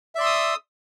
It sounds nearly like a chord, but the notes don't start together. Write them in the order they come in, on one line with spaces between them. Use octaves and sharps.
E5 D5 C6 E6 D#6